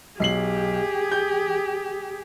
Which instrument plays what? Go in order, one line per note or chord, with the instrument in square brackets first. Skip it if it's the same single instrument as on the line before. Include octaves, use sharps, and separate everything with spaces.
[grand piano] B1 C7 F#7 [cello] G4 G#4
[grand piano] G6